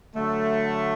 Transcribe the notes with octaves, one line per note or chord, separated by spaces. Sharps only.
D3 F#3 A3